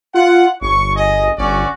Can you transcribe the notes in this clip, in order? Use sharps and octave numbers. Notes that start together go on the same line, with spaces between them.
F4 F#5
G1 C#5 C#6
G#4 D#5
G1 C#4 F#4 D5